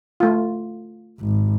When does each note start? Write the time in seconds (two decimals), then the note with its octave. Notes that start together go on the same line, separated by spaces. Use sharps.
0.20 A3 F4
1.20 G#1